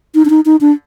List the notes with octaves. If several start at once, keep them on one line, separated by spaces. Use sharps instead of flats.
D#4
D4
D#4
D#4
D4